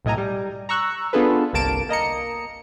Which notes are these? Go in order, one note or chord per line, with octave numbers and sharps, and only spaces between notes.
B1 A2 D#5 G#5 A#5
G3
A#5 C#6 E6 F#6
B3 D4 F4 G#4 A4 B4
G1 C2 A#3 A5 D7 E7
A#3 D#5 A#5 C#7